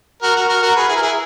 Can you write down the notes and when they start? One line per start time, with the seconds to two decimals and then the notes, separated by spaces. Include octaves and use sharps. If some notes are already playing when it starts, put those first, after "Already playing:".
0.22 F#4 A#4
0.36 F#4 A#4
0.49 F#4 A#4
0.62 F#4 A#4
0.76 G#4 B4
0.88 E4 G#4
0.96 A#4
1.02 E4 G#4